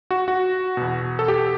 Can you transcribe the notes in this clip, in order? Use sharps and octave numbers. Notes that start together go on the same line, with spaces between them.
F#4
F#4
E2 B2
A4
G4